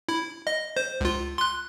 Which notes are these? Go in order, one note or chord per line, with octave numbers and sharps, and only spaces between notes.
E4
D#5
C5
C#2 F4
C6 F#6